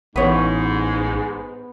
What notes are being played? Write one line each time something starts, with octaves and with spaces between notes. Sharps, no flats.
A1 G#2 B3 B4 C#5